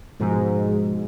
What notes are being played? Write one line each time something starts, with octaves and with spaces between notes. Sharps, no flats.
G#2 B2 F3 G#3